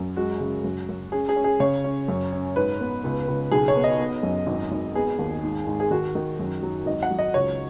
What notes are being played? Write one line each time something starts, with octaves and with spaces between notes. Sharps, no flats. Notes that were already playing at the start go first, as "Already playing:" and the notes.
Already playing: F#2
G#3 F#4
C#3
F#2
F#2
C#4 G#4
G#4
C#4
G#4
C#3 C#5
C#4
F#2
C#4
G#2 B4
B3
C#2
C#2
B1 G#4
C#5
B3
D#5
B3
F#2
G#1
G#1
B3 G#4
D#2
G#2
G#2
G#4
D#3 F#4
D#3
F#2
F#3
G#1 D#5
F#5
F#3
D#5
C#2 C#5